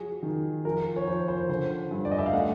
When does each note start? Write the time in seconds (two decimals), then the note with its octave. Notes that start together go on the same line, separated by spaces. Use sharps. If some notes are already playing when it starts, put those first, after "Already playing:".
Already playing: F3 F#3 G#4
0.23 D#3
0.65 F3 A#4
0.96 C#5
1.07 F3 C5
1.28 C5
1.49 D3 C5
1.91 G2
2.05 D5
2.11 D#5
2.19 E5
2.26 F5
2.33 A3 F#5